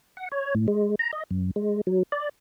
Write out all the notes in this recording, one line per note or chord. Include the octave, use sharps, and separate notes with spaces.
F#5
C#5
A2
G#3
A#5
D#5
F#2
G#3
F#3
D5